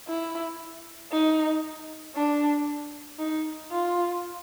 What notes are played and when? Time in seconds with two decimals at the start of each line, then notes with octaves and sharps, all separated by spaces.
0.08 E4
1.12 D#4
2.16 D4
3.19 D#4
3.71 F4